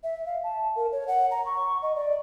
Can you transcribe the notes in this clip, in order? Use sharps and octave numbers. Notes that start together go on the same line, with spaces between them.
E5
F5
A5
A#4
C#5
F#5
A#5
C#6
D#5
D5